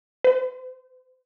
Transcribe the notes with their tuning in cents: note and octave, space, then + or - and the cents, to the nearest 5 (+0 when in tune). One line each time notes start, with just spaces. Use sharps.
C5 -40